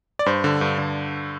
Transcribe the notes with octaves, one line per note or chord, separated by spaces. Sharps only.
D5
G2 C5
D3
G2
D3